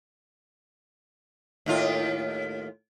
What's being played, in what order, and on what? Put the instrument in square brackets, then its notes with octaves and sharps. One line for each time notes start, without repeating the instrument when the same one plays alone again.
[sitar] D#2 A2 F4